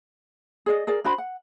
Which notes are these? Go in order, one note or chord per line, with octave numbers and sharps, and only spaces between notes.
G#4 D5 D#5
G#4 A#4 D5
D4 F#4 C5 B5
F#5